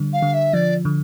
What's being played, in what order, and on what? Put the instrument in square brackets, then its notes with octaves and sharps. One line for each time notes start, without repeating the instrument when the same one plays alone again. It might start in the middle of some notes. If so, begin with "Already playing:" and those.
Already playing: [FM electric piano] D3 G3
[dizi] F5
[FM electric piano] D3
[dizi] E5
[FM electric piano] F3 [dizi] D5
[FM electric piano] D3